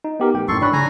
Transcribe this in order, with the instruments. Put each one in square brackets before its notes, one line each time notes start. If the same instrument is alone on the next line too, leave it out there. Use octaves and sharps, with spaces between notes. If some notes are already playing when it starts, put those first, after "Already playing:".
[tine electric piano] D#4
B3 G4 A#4
A#1 A3 G5
[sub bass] A#1 [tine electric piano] F#2 A2 [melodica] A4 C6 C#6
[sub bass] G#2 [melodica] C#4 [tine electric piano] D4 B5 F#6
[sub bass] C#3 [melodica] G#5 A#5